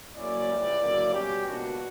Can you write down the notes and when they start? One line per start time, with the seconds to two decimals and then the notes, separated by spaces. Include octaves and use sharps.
0.16 C#3 F#3 A#3 C#4 E4 D5
0.49 C#2 C#3 E3 G3
0.81 D2 C#3 F#3 A#3 E4
1.14 B2 G3 C#4 G4
1.46 C#2 B2 A#3 D4 F#4